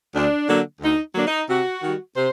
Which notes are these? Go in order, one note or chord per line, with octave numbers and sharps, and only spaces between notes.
D2 D4
D3 F#3 A#3 D4
D2 D#4
D3 F#3 A#3 D4
D#4
C3 F#4
D#3 G3
C3 C5